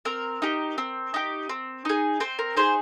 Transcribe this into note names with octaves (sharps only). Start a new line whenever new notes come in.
C4 A#4
D#4 G4
C4
D#4 G4
C4
D#4 G#4
C4 C5
A#4
D#4 G#4 C5